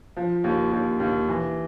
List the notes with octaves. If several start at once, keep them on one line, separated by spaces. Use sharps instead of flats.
F3
D#2
D#2
D#2
E3